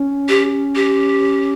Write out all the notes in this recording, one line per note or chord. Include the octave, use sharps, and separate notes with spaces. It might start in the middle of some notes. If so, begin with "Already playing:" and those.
Already playing: C#4
G4
G4